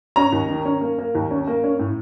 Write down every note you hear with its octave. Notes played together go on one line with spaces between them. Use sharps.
C#4 A#5
D#2
D#3
C#4
A#3
A#3
D#2
C#4
A#3
C#4
A2